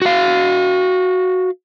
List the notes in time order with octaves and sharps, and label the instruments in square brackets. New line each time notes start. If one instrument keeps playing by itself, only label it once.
[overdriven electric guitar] F#4 F5